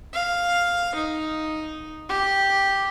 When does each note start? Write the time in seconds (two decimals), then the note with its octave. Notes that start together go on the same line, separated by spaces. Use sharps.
0.13 F5
0.95 D#4
2.09 G4